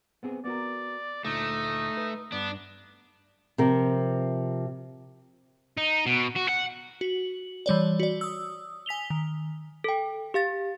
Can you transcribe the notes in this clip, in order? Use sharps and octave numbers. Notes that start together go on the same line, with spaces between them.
B3 C4 G#4
B3 F#4 A#4 D5
D2 A#2 A3 D#4
B4
G2 B3 D4
C3 F3 A#4
D#4
B2
F#4
F#5
F#4 F#7
E3 G3 C#5 D5
F#4 D5
D#6 E6
G#5 B6 F7 G7
D#3
A4 G5
G4 F5 A6